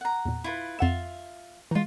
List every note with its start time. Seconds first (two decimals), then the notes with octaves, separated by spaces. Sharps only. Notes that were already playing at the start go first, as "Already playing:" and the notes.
0.01 F#5 A#5
0.25 E2 A#2
0.44 E4 F4 B4
0.79 F2 F4 E5 F#5 E7
1.71 E3 G#3 D#4 F4